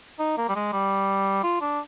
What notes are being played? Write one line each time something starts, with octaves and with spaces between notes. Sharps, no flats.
D#4
A#3
G3
G#3
G3
F4
D4